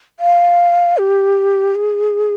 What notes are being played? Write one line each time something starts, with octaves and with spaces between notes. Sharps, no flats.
F5
G4
G#4